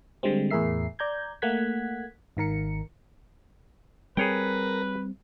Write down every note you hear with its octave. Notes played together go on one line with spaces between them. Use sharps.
D3 G3 G#3 C4
E2 A2 G#4 A#4 E5 C7
D5 A#5 G6 G#6
A3 A#3 F#5 F#6 G#6 B6
G#1 D#3 A#4 C#7
G3 C4 G#4 A#4 B4 C#5 G5 A#6